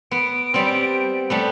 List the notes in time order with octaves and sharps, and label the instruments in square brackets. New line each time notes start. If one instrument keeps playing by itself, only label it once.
[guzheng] B3 [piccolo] D7
[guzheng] G3 B3 C4
G3 A3 B3